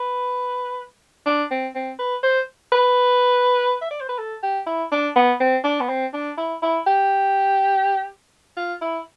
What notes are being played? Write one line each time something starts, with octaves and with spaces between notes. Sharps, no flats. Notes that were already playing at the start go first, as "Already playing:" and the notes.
Already playing: B4
D4
C4
C4
B4
C5
B4
E5
D5
C5
B4
A4
G4
E4
D4
B3
C4
D4
B3
C4
D4
E4
E4
G4
F4
E4